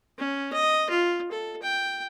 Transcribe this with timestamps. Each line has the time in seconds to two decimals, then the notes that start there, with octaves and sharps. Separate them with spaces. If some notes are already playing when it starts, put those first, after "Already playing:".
0.19 C#4
0.53 D#5
0.90 F4
1.31 A4
1.62 G5